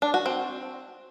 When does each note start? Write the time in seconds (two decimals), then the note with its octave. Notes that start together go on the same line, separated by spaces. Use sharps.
0.02 D4
0.14 F#4
0.26 C4